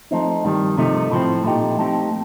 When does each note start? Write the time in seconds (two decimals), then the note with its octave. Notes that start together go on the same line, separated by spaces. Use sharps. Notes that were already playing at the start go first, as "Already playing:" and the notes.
0.11 F3 A3 C4 D#4
0.44 G2 D#3 G3
0.78 C3 F3 A3 D#4
1.11 A2 F3 C4
1.45 A#2 A3 D#4 G4
1.79 F3 A3 C4 D#4 G4